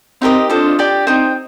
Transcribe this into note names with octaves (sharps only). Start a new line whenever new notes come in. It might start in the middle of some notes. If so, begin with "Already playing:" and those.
C4 D#4 G4 A#4 D#5
D4 F4 A4 C5 D#5
G4 D5 G5 D6
C4 D#4 C5 D#5 G5